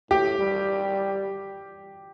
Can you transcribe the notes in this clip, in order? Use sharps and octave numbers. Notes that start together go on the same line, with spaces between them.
A2 G4
G3